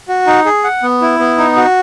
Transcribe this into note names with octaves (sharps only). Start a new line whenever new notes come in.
F#4
D#4
G#4
F#5
B3
E4
B3
D#4
F#4